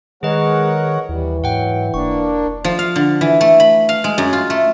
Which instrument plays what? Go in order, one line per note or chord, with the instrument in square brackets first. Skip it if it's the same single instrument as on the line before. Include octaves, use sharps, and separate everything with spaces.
[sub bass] D#3 [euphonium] G#3 [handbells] G#4 B4 D#5 [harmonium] A#4 C#5 F#5
[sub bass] D#2 [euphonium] E3 [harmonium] G3
[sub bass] G#2 [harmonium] F#3 [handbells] F#5 G5
[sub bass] E1 [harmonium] A#3 D4 [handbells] C#6
[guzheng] F3
F5
D3
E3
A3
B5
F5
G#3
F#2
F4
A3